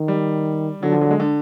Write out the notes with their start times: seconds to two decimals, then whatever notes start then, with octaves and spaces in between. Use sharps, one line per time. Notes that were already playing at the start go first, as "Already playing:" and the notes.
Already playing: D#3
0.08 G3
0.82 D3 F#3
0.92 F3
1.01 F#3
1.11 G#3
1.20 D3